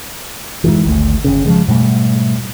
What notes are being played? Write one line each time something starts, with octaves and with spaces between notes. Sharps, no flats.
G#2 B2 E3
G#1 D2 A3
G1 C#3
C#3 F3 G#3
G#2 B2 G3 A3